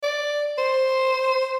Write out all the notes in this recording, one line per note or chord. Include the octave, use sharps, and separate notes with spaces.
D5
C5